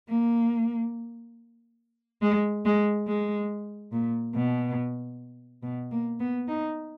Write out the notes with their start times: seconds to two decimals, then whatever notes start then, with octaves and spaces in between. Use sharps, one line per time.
0.09 A#3
2.22 G#3
2.65 G#3
3.07 G#3
3.92 A#2
4.35 B2
5.63 B2
5.91 A#3
6.20 B3
6.48 D#4